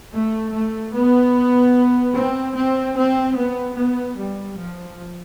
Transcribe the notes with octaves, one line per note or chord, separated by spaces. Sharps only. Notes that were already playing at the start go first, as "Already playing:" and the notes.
A3
A3
B3
C4
C4
C4
B3
B3
G3
F3